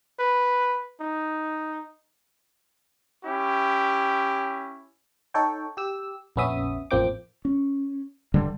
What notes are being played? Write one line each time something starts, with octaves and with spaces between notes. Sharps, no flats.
B4
D#4
C#4 E4 G4
D#4 A4 C#5 G5
G4 E6
A#1 F2 B3 C#4 E5 D#6
A1 F2 A#3 C4 G5 D6
C#4
D1 G2 D3 G3